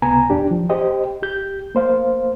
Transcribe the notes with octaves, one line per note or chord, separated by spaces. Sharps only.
C#2 C3 B3 G#5 A#5
E2 D4 G4
F3
G4 C5 D#5 G5
G4 G6
A#3 C5 F5